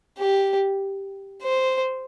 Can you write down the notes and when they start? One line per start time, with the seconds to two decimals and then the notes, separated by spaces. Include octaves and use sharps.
0.18 G4
1.42 C5